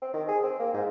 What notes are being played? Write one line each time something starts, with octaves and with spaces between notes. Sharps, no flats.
C4
D#3
G#4
C4
A#3
G#2